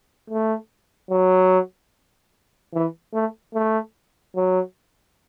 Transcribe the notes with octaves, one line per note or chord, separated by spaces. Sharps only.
A3
F#3
E3
A3
A3
F#3